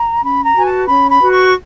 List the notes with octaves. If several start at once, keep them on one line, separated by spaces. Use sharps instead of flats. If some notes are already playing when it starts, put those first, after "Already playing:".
Already playing: A#5
C#4 B5
A#5
F#4 B4 G#5
A5
C#4 B5
B5
F#4 B4
C#6